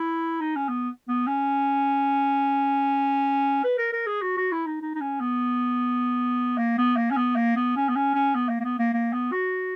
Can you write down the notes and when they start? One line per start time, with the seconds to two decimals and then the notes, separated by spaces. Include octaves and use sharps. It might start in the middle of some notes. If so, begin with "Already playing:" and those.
Already playing: E4
0.41 D#4
0.56 C#4
0.69 B3
1.08 B3
1.27 C#4
3.64 B4
3.78 A#4
3.93 A#4
4.07 G#4
4.22 F#4
4.37 F#4
4.52 E4
4.66 D#4
4.81 D#4
4.95 D#4
5.00 C#4
5.20 B3
6.58 A#3
6.78 B3
6.97 A#3
7.11 C#4
7.17 B3
7.36 A#3
7.56 B3
7.76 C#4
7.89 B3
7.96 C#4
8.14 C#4
8.35 B3
8.49 A#3
8.60 A#3
8.64 B3
8.79 A#3
8.93 A#3
9.13 B3
9.32 F#4